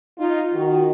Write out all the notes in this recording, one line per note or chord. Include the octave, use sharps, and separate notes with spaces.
D#4 F4
D#3 F#4